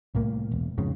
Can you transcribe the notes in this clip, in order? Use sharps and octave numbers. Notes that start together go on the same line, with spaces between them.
C2 A2 A#3
E1
F2 G#2 C#3